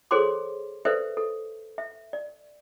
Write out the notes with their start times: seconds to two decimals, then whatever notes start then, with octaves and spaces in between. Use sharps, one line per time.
0.11 G#4 A4 C5 C#5 C6 D6
0.85 A4 B4 C5 D5 E5
1.17 A4
1.78 E5
2.13 D5